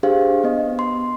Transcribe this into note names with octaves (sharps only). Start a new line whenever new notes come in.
D4 G4 G#4 C5 F5
B3 D#5
C6